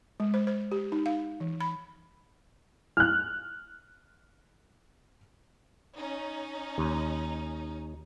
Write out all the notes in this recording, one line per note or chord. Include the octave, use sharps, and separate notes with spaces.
G#3
C5
C5
G4
D#4
F5
E3
B5
F6 F#6
C#4 D#4
D#2